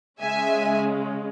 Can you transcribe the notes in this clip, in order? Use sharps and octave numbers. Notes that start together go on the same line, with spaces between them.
C#3 G#3 C#4 E5 G#5